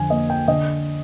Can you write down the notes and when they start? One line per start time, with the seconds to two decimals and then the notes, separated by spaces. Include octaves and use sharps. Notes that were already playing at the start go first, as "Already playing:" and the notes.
Already playing: F2 D3 G#5
0.10 A#3 D#5
0.30 G5
0.48 D3 D#5